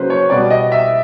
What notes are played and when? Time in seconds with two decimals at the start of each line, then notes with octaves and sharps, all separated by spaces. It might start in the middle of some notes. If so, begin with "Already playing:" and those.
Already playing: C#3 F#3 A#3 B4 C5
0.10 C#5
0.30 B2 G3 B3 D5
0.50 D#5
0.72 E5